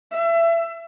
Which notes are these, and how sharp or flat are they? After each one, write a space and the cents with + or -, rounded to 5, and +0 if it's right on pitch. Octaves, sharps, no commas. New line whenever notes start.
E5 +30